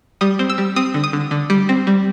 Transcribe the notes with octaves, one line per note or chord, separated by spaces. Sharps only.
G3 D#6
C4
E6
G3
C4 D#6
D3
D#6
D3
D3
G3
C4
G3